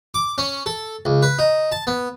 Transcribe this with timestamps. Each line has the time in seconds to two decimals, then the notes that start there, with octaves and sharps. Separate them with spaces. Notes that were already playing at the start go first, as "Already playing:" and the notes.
0.14 D6
0.38 C#4
0.66 A4
1.05 C#2
1.23 B4
1.39 D#4
1.72 A5
1.87 B3